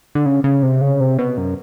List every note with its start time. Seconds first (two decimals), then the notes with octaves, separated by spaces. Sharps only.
0.15 D3
0.26 C#3
0.44 C#3
0.63 C3
0.81 C#3
1.00 C3
1.18 B2
1.38 F#2